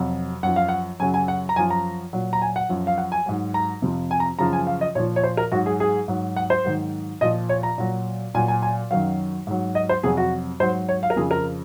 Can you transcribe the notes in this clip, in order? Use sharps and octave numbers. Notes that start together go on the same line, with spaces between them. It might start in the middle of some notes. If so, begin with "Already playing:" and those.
Already playing: F2 C3 F#3
F#2 F3 F#5
F5
F#5
F#2 C#3 F#3 G#5
G#5
F#5
A#5
F#2 F3 G#5
A#5
A#2 F#3
A#5
G#5
F#5
F#2 F3
F5
F#5
G#5
G#2 F#3
A#5
F2 C3 F3
G#5
A#5
F#2 C#3 F3 A#5
G#5
F5
D#5
A#2 F3 C#5
C#5
C5
A#4
G#2 F#3 F#4
G#4
G#4
G#2 F#3
F#5
C5
G#2 D#3 F#3
A#2 F3 D#5
C#5
A#5
A#2 F#3
A#2 F#3 G#5
G#5
G#5
F#2 D#3 F#3 F5
G#2 F#3
D#5
C5
F2 C3 F#3 G#4
F#4
G#2 F#3 C5
C#5
F5
A#4
F2 C#3 F3 G#4
A#4